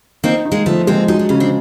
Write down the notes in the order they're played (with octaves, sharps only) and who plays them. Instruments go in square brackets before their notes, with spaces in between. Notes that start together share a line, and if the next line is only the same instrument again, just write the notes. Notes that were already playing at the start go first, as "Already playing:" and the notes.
[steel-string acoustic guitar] A#3 C4 [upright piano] D#4
[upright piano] D#4
[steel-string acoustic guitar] G#3 A#3
[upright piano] F3 [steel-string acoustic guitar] A3 B3
[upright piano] G#3 [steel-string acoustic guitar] A#3 C4
[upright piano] F#3 [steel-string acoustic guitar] D#4
[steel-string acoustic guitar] D4
[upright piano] C#3 [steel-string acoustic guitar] C#4
[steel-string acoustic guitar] C4 D4